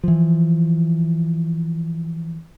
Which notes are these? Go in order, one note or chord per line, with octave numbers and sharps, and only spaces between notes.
E3 F3